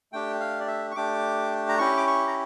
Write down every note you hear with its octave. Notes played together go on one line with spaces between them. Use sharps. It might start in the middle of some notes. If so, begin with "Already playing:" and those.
A3 D4 G4 G5
F5
D5
E5
C#6
A3 D4 G4 D6
A#5
C#4 E4 G4 C#6
D6
C#6
A#5